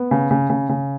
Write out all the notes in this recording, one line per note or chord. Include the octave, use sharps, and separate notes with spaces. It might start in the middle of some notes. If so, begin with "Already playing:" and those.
Already playing: B3
C#3
C#3
C#3
C#3